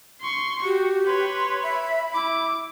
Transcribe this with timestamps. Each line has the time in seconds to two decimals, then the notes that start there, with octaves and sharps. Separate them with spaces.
0.21 C6 C#6
0.64 F#4 G4
1.07 B4 C#5 C6
1.63 E5 B5
2.14 E4 D6